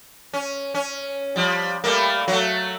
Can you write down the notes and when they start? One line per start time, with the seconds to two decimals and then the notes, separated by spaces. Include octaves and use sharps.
0.33 C#4
0.74 C#4
1.36 F3 G3
1.84 G3 A3 A#3
2.28 F#3 A3